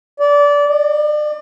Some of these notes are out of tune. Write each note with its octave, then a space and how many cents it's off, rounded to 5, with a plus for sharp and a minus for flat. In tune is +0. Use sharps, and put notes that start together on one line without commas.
D5 -20
D5 +40